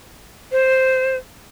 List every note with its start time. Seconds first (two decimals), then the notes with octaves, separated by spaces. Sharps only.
0.52 C5